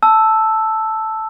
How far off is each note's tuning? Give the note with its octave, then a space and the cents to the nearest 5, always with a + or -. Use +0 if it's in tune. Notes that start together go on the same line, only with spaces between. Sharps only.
A5 +0 E6 +0